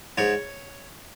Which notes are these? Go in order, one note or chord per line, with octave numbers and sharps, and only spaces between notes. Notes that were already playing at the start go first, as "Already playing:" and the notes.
G#2 C#5